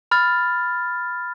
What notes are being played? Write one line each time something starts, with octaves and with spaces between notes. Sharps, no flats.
B5 F6 A6